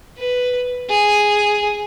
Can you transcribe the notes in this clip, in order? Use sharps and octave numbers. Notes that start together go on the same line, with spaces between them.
B4
G#4